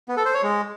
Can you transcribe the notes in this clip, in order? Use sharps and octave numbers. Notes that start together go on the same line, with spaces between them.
B3
A4
C5
C#5
G#3